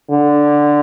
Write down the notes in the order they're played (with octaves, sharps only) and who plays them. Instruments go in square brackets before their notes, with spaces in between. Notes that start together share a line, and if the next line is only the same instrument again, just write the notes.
[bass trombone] D3